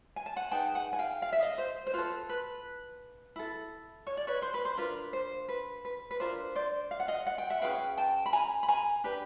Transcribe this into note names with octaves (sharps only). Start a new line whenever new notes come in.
G#5
A5
F#5 G#5
D#4 G#4 B4 G5 A5
F#5 G#5
G#5
F5 G5
F5
E5
D#5 F5
C5
C5
F4 A4 B4
B4
E4 A4
C#5
D5
B4 C#5
C5
B4
C5
D4 F4 A#4 B4
C5
B4
B4
B4
D4 F4 A#4 C5
C5 D5
F5
F#5
D#5 F5
F#5
G5
E5 F#5
C#4 F4 G#4 B4 F5 G5
G5 A5
B5
G#5 A#5
B5
G#5 A#5
D4 G4 B4